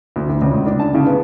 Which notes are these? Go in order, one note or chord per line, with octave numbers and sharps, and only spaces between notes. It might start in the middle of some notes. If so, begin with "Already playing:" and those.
D2
D2
C#2
D4
A5
C#3
B3